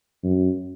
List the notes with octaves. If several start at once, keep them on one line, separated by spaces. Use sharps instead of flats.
F#2